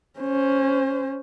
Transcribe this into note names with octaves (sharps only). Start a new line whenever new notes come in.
C#4 C5